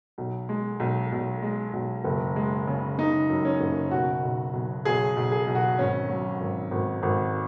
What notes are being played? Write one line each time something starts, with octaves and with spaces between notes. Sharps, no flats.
B1
G#3
B1
B1
G#3
B1
F#1
G#3
C#3
C#3 D#4
F#2
C#4
F#1
B2 F#4
B1
B1
B1 G#4
B1
G#4
B1
F#4
G#1 C#4
F#3
G#1
G#1
G#1